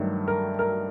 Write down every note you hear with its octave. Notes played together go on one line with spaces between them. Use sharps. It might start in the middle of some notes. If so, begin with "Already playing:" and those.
Already playing: G2 D#3 F#3 A3
A#4
A#4